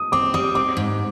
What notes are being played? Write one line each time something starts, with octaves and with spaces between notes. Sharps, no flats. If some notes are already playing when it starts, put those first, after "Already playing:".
Already playing: D#6
C4 D6
G3 D#6
C4 D6
G#2